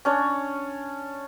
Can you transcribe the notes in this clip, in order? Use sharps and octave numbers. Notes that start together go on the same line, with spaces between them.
C#4 D4 C#5